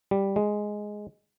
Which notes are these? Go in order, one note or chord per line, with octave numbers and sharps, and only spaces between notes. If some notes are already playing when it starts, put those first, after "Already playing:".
G3
G#3